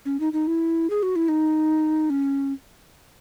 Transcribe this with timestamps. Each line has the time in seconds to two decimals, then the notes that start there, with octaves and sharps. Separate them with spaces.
0.05 C#4
0.20 D#4
0.33 D#4
0.47 E4
0.90 G#4
1.03 F#4
1.16 E4
1.29 D#4
2.10 C#4